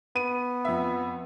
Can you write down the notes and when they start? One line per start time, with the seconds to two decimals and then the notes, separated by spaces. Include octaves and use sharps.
0.16 B3 D#7
0.65 F2 E5